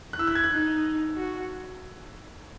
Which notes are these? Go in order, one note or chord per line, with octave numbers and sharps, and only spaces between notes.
F#6
E4 E6
F#6
G#6
F#6
D#4
F#4